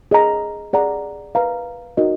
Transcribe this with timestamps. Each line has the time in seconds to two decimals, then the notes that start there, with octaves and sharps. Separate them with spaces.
0.11 G#4 D#5 A#5
0.73 G#4 D5 F#5 A#5
1.35 B4 F5 A#5
1.97 D#4 F#4 A#4 D#5